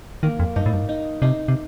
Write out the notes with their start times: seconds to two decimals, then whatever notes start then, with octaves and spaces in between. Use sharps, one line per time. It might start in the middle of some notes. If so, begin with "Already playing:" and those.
0.23 D#3 A#3
0.40 F2
0.56 G2 D#4
0.66 A2
0.73 G2
0.89 D#4
1.22 C3 D#4
1.48 C3